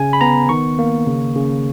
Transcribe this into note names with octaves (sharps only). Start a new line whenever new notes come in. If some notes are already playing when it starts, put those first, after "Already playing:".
Already playing: C#3 G#5
B5
B3 A#5
D#3 C#6
A#3
C#3
C#3